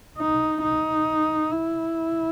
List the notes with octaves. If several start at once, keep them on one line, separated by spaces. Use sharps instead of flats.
D#4
D#4
E4